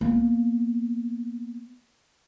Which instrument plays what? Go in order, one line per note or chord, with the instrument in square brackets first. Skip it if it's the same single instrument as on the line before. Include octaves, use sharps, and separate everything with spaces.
[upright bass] A#3 B3